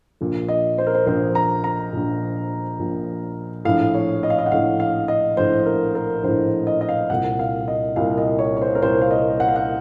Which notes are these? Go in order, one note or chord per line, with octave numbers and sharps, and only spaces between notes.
A#1 A#2
D#5
C5
A#4
C5
A#1 A#2 C5
A#5
A#5
A#1 A#2
A#1 A#2
A#1 A2 F5
C#5
D#5
F5
D#5
F#5
A#1 A2 F5
F5
D#5
A#1 A2 C5
A#4
A#4
A#1 A2 C5
D#5
D#5
F5
C2 A#2 F#5
F5
D#5
C2 A#2 F5
D#5
C#5
C#5
C5
A#4
C2 A#2 C5
F5
D#5
F#5
F5
F#5